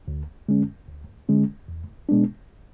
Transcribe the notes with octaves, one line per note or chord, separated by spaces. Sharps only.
D2
D3 G#3 C#4
D2
D3 G#3 C#4
E2
B2 G#3 B3 D4